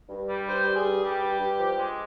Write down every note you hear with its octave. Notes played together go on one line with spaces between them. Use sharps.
G2
G3
G2 C5
G3
G#4
G2
G3 G4
G2
G2
F3
G#3